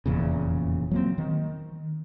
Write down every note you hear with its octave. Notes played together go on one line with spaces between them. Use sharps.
F1 E2 A#2 C#3
F#3 A#3 C4
D#3